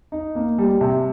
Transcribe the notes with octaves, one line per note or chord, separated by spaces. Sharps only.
D#4
A#3
G3
C3